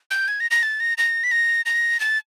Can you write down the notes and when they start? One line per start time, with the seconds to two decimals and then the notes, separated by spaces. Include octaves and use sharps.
0.11 G6
0.28 G#6
0.40 A#6
0.51 A#6
0.63 A6
0.80 A#6
0.98 A#6
1.24 B6
1.31 A#6
1.66 A#6
2.00 A6